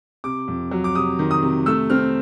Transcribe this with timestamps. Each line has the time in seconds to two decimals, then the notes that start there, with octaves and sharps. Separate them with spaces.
0.24 C3 D6
0.48 F2
0.71 F#3
0.84 D6
0.95 C3 D#6
1.19 D#3
1.31 D#6
1.42 C3
1.66 A3 E6
1.90 C4 F6